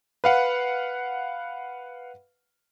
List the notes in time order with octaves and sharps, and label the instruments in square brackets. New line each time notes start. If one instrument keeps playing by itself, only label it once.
[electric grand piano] B4 F5 F#5